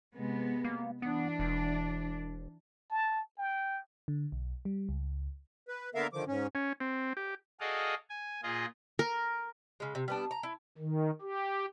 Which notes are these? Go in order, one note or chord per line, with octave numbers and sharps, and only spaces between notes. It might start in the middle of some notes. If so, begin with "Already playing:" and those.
C3 G#3 B3
A#3
E3 B3 D4
E1
A5
G5
D3
B1
G3
C#2
B4
D3 A#3 B3 A#4 E5 F5
D3 D#3 F3 D6
G#2 C#4
C#4
C4
G4
F#4 G#4 A4 D5 D#5 F5
G#5
A#2 F4 G#4 D#5
A#4
C#3 G#3
C3
G3 B3 D4
A#5
E4
D#3
G4